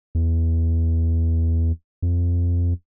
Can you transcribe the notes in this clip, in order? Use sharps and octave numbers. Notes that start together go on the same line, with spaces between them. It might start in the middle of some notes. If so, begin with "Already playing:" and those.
E2
F2